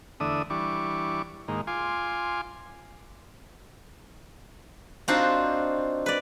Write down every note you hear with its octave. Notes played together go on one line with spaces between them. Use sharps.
E2 D3 A3 D4 E5 D#6
E3 G3 D4 C#6 D6
G#2 D#3 A#3
F4 G#5 C6 D6
C4 D4 D#4 F4 F#4 C5
B4 D5